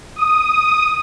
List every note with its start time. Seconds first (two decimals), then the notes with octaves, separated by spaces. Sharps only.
0.16 D#6